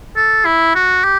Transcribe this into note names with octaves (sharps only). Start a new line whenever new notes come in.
A4
E4
F#4
G4